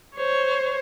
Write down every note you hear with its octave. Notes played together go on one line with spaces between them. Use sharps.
C5 C#5